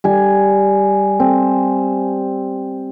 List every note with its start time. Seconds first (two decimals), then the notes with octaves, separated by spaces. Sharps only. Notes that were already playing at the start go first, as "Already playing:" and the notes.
0.04 G3 G#5
1.20 C4